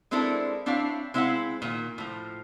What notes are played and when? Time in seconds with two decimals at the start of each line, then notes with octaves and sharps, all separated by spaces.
0.11 G#3 C4 D4 E4 A4 A#4
0.66 C4 D4 E4 C#5 E5 F5
1.14 G#3 C4 E4 D#5 F5 F#5
1.62 A#2 D#3 A#3
1.98 A2 F3